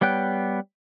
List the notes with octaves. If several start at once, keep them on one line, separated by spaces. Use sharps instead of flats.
G3 B3 C#5 G5 F#6